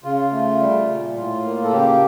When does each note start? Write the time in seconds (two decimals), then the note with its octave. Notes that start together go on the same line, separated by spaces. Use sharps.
0.04 C#3 F4
0.32 A3
0.59 G3
0.87 A#2
1.16 A2 F4
1.44 A#3
1.64 A4
1.71 C#3 G4